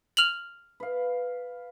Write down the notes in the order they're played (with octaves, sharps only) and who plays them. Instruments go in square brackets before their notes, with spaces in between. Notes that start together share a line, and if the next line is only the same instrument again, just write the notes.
[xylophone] F6 F7 F#7
[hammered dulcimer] B4 F5